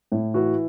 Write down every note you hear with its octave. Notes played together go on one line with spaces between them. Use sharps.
A2
E3 F#4